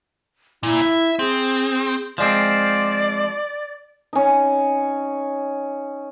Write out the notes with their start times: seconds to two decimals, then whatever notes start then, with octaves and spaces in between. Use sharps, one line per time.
0.63 A#2 E4
0.82 E5
1.19 C4 G#4
2.18 F3 G#3 C4 D5
4.13 C#4 D#4